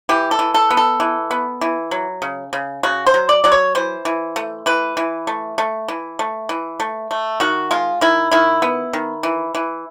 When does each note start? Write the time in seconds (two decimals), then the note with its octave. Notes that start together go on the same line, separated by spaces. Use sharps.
0.09 E3 G4
0.31 A4
0.39 E3
0.54 A4
0.71 B3
0.77 A4
1.00 E3
1.31 B3
1.61 E3
1.91 F#3
2.22 C#3
2.53 C#3
2.83 C#3 F#4
3.06 C5
3.14 F#3
3.29 D5
3.44 F#3 D5
3.52 C#5
3.75 E3 C5
4.05 E3
4.36 A3
4.66 E3 B4
4.97 E3
5.27 A3
5.58 A3
5.88 E3
6.19 A3
6.49 E3
6.80 A3
7.11 A3
7.40 D#3 F#4
7.71 G#3 F4
8.01 D#3 E4
8.31 D#3 E4
8.62 B3
8.93 D#3
9.23 E3
9.55 E3